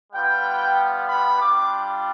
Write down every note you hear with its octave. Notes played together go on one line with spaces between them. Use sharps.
G3 B3 F4 G5
B5
G3 D4 F4 D6